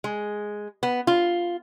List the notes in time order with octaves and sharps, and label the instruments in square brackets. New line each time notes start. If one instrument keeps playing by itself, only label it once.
[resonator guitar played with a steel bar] G#3
B3
F4